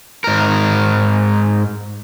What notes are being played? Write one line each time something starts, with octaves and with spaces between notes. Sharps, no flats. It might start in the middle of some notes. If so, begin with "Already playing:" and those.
G#2 A#4